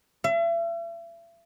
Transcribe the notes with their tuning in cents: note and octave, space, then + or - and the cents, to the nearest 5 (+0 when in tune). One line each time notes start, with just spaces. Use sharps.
E5 +40